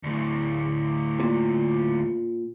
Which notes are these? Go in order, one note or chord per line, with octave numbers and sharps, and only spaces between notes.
D2 A2
A#2